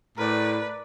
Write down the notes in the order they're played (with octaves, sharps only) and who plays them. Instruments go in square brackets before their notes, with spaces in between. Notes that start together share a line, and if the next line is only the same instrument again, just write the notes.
[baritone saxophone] A2 [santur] A#4 D5 [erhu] B4